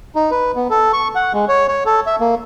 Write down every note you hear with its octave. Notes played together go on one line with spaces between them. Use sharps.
D#4
B4
B3
A4
C#6
F#5
G#3
C#5
C#5
A4
E5
A#3